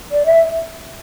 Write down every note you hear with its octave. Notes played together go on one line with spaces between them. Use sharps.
D5
E5